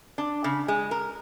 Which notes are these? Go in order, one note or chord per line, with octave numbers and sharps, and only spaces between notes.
D4
C#3
G#3
A#4